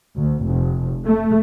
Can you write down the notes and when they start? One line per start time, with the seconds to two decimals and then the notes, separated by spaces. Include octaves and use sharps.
0.17 D2
0.47 F1
1.05 A3